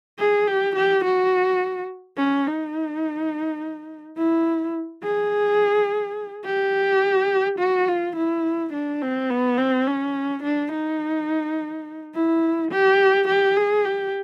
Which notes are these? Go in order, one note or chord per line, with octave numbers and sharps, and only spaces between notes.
G#4
G4
G4
F#4
C#4
D#4
E4
G#4
G4
F#4
F4
E4
D4
C4
B3
C4
C#4
D4
D#4
E4
G4
G4
G#4
G4